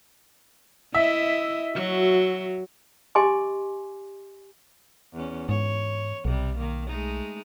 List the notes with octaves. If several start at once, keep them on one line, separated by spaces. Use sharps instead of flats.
E4 D#5 E5
F#3 F#4
G4 D#5 G#5 C6 D6
E2 C#4
G#2 C#5
B1 C3 G3
D#3 A#3
G#3 A3 D#4